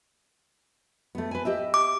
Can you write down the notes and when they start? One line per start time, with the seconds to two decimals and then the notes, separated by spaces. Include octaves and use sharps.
1.15 A3 B3
1.31 B4 G#5
1.45 G4 D#5 E5
1.74 D6